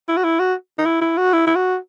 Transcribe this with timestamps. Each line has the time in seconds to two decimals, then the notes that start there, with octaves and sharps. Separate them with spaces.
0.08 E4
0.17 F#4
0.24 E4
0.39 F#4
0.79 D#4
0.86 E4
1.01 E4
1.17 F#4
1.33 E4
1.47 E4
1.56 F#4